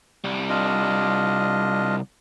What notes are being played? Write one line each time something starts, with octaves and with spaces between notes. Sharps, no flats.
C2 G3
D4 F4 D#5